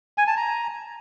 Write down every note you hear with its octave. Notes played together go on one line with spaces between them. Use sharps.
G#5
A5
A#5